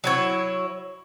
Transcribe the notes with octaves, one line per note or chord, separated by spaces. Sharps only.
F#3 E4 C#5